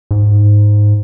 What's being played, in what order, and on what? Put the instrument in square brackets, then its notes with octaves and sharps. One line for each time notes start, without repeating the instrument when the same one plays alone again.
[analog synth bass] G#2